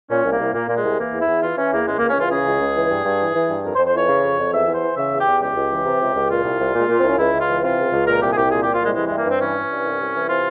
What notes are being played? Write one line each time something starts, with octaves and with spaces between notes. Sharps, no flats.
A#2 C#4
C2
A#3
C2
A#2 A#3
A#2 A#3
G#3
C2
E3 A#3
E2
E4
E2
E3 F4
E3 C#4
E2 A#3
C#2 G#3
C#2 A#3
C#4
E3 F4
C#3 G#4
C#2
C#2
E3
G2
G2
E3
E3
G2
F2 A#4
C5
F2
C5
E3 C#5
C#3
F2
F2
E2 E5
E2
C5
E3
C#3 E5
E2
G4
E2
C#2 G4
C#2
E3
C3
C#2
C#2
A#2 F4
C2
C2
A#2 G#3
A#2 A#3
C4
C2 C#4
C#2 E4
C#2
F4
E3
C3 F4
C#2
C#2
A#2 A#4
C2 G4
G#4
C2 G4
A#2 G#4
A#2 G4
F4
C2 G#3
E3 G#3
G2 G#3
A#3
G2 C4
E3 C#4
E3
G2
C2
C2
E3
C3 F4